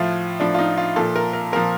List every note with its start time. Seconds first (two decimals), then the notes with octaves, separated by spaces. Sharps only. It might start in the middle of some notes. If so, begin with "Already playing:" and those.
Already playing: A2 F3 F4
0.40 A2 F3 D4
0.54 F4
0.59 D#4
0.77 F4
0.96 A#2 F3 A4
1.16 A#4
1.33 A#4
1.52 A#2 F3 A#4